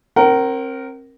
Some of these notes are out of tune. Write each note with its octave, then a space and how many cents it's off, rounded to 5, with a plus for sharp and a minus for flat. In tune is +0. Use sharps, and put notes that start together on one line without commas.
C4 +35 A#4 +0 F#5 +45